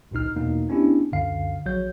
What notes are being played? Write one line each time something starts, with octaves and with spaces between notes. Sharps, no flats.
G#1 C#2 A#2 D#4 F6
E2 B2 A#3 D#4
B3 C#4 D4 E4 G4
C#2 F#2 D3 F5 C7
A#1 F#3 C#5 G6